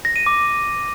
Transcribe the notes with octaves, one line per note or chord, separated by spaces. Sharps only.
A#6
D#7
D6